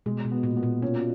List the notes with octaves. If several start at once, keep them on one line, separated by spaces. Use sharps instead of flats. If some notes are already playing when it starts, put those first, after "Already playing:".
B2 G#3
B2
B3
A#2
B3
A#2
B2 C#4